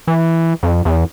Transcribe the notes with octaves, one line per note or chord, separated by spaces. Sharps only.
E3
F2
E2